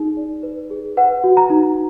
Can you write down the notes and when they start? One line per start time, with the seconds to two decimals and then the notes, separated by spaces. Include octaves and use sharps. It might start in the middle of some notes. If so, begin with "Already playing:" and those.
Already playing: D#4 G#4
0.17 D5
0.43 B4
0.70 G#4
0.97 B4 F#5
1.24 F#4
1.37 A#5
1.50 D#4